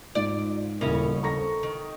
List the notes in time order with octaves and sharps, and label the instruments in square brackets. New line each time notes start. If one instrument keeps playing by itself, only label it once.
[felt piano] G#2 [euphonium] F4 [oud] D5
[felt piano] D#1 E4 [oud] F2 C#3 C#4 [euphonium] A#4
[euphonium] A4 [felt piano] A#5 C#6 A#6
[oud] D#3